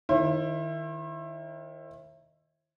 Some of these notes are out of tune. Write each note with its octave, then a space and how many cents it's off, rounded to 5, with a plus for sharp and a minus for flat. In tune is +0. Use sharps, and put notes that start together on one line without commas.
D#3 +0 E4 +15 C5 +45